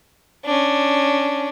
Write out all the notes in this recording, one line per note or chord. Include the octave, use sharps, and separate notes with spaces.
C#4 D4